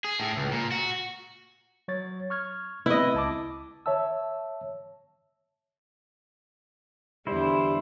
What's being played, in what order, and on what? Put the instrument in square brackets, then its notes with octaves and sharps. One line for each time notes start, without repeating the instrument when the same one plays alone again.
[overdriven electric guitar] G#4
A2
C#2
A#2
F#4
[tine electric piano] F#3 C#5 A6
C#6 F6 G#6
[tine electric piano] B3 C4 B4 [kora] E4 D#5
[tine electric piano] C#2 A5 D6
[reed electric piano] C#5 E5 A5 E6
[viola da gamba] E2 D3 D4 [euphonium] G3 [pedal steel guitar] E4 C5